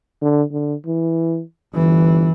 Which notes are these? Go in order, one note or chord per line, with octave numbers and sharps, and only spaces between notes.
D3
D3
E3
G1 E3